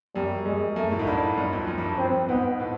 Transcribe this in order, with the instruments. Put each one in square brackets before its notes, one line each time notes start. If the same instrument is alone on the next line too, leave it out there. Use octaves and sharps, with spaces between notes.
[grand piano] F#2 [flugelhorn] G3
[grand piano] F#2 [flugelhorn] G#3
[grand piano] F#2 [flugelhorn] A3
[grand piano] A2
G#2
[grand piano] G2 [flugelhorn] D4
[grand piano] F#2
F2
F#2
G2
F2
[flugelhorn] C4
[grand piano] G#2 [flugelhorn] B3
[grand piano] A2